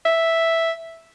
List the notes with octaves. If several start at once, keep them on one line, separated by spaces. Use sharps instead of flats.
E5